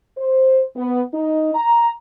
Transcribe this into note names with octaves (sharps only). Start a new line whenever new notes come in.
C5
B3
D#4
A#5